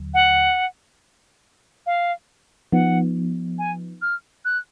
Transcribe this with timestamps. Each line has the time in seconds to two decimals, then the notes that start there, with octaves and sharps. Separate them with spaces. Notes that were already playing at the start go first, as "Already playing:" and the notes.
Already playing: D#2 D3 F#3
0.14 F#5
1.86 F5
2.72 F3 B3 D#4 F#5
3.59 G#5
4.02 F6
4.45 F#6